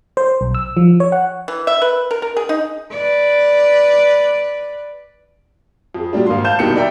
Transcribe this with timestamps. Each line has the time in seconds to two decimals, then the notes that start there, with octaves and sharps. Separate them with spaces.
0.17 C5
0.41 B1
0.55 E6
0.77 F3
1.00 C#5
1.12 F#5
1.48 E3
1.67 E5
1.82 B4
2.11 A#4
2.22 A#4
2.37 G#4
2.49 D#4
2.91 B4 D5
5.94 F2 G#4
6.13 A#2 F#3 G3 D4
6.26 G#1 A#3 F5 C6
6.44 F5 A5 G6 E7
6.59 C2 B2 D#3 G3 A#3 C#7
6.76 D5 E5 G5 A#5